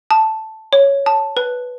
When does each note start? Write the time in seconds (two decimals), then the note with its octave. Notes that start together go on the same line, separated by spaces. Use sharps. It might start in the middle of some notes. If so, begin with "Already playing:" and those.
0.11 A5
0.73 C#5
1.06 A5
1.37 B4